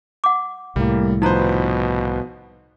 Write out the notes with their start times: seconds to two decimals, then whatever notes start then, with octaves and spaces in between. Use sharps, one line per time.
0.24 F#5 D6
0.76 C2 A2 G3 A#3
1.22 B2 F3 D#4 B4 C5 A#5